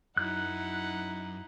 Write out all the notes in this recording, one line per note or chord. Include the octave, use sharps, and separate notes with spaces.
F#2 D#4 E4 F#5 F#6